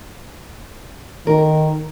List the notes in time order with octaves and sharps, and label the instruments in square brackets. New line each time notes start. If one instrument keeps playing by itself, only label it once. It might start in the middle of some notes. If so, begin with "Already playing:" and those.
[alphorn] D#3 [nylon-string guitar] A#4